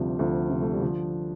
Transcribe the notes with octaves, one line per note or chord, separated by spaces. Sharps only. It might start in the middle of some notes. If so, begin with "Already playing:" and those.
Already playing: D2 C3 F3 G3
D2 F3
C3 F3
A3
G3
D3 F3